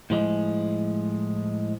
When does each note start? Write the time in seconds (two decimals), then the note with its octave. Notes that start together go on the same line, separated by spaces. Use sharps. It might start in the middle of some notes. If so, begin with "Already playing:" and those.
0.10 A2 F3 G#3